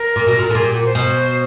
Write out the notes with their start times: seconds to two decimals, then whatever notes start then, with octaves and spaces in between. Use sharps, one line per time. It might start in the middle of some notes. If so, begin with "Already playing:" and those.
Already playing: A#4
0.16 A#2
0.27 B2
0.39 A#2
0.50 A2
0.55 A#2 G#4
0.65 G4
0.74 F#4
0.85 C5
0.95 B2